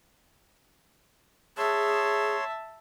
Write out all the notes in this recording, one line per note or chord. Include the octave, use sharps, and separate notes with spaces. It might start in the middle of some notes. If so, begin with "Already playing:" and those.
G#4 C#5 E5 A5 C6